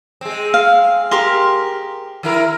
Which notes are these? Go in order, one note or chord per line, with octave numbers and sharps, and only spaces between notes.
G#3 C4
F5
G4 A#4 C6
D#3 E4 A#4